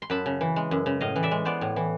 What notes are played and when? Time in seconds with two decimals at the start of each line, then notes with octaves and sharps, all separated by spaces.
0.02 C6
0.10 F#2 A5 B5
0.26 C#3
0.41 E3
0.56 G#3
0.71 F#2
0.86 C#3
1.01 A2 D#5 F5
1.16 E3
1.23 D5 E5
1.31 G#3
1.45 B3 C5 D5
1.61 A2
1.76 E3